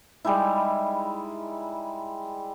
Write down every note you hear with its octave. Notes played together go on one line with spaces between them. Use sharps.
G3 G#3 D#4 E4